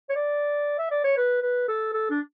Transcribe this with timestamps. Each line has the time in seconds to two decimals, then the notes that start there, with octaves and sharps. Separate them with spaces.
0.09 C#5
0.15 D5
0.79 E5
0.91 D5
1.04 C#5
1.17 B4
1.42 B4
1.68 A4
1.93 A4
2.10 D4